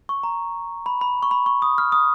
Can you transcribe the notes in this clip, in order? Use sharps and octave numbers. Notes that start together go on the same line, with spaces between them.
C#6
A#5
B5
B5
C#6
B5
C#6
D#6
F6
D#6